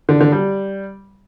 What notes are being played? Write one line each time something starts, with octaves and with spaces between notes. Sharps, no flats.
D3
D3
G3